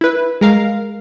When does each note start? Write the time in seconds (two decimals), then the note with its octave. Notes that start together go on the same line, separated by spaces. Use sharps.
0.01 E4 B4
0.41 G#3 A#4 F5